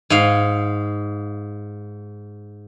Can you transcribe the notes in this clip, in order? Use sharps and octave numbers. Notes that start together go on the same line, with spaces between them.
G#2 F5